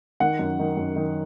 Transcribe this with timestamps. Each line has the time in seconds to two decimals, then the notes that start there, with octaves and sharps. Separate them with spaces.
0.20 D#3 F#5
0.39 F#2
0.59 D#3
0.77 F#2
0.96 D#3